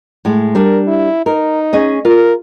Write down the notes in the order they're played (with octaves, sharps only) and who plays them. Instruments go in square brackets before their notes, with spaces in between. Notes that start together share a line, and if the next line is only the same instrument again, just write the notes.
[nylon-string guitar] A2 G#3
[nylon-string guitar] G3 D4 [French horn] A#4
[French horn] E4
[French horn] D#4 [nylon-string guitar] A#4
[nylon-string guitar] C#4 G#4 D#5
[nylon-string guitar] F4 [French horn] A#4